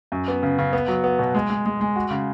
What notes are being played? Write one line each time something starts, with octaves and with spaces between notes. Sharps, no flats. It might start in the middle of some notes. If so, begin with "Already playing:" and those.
F#2
B3
C#3
C#3
B3
F#3
B3
B2
G#3
G#3
G#3
G#3
F#4
C#3